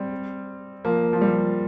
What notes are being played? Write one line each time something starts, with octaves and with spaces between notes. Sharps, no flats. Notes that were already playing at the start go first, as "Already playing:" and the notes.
Already playing: G3 C4
F3 A#3
F3
G3